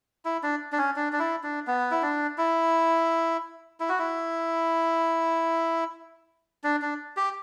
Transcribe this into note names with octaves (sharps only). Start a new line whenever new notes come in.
E4
D4
D4
C#4
D4
D4
E4
D4
B3
E4
D4
E4
E4
F#4
E4
D4
D4
G4